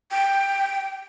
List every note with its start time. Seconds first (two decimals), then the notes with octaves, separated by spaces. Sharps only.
0.11 G5